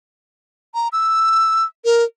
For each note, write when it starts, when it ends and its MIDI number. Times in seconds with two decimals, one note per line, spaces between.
0.75 0.88 82
0.92 1.64 88
1.85 2.04 70